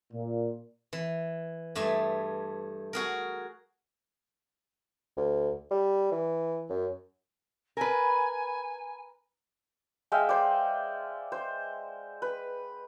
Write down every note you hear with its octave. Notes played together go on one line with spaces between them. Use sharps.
A#2
E3
G2 A3 G#4 E5
F#4 G#4 A#4
D2
G3
E3
F#2
A#4 B4 G#5
G#3 E5 F5 G5
C5 D5
C5
B4